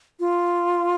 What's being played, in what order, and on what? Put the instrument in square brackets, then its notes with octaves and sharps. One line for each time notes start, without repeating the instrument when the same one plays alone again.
[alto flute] F4